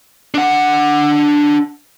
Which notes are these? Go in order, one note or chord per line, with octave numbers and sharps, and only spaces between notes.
D4 F#5